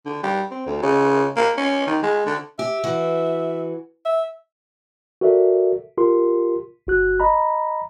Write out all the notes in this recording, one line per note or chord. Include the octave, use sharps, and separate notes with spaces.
D3
G3
C4
D2
C#3
A#3
C#4
D#3
G#3
D3
G4 E5
E3 F#4
E5
F#4 A4 A#4 D5 E5
F4 G4 A#4 C6
G1 F#4 F#6
D#5 A#5 B5